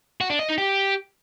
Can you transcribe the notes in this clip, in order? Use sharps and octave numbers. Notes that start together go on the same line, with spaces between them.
F#4
D4
D#5
D#4
G4